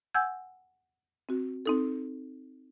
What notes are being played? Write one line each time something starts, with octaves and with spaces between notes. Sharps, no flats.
F#5 G#5 E6 G6 G#6
C4 F#4
C4 D#4 A4